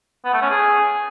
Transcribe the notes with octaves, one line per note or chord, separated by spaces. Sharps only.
B3
A3
C#4
G#4